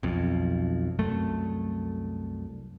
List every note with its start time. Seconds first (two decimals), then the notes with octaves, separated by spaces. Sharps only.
0.03 B1 F2
0.99 C2 F#2 A3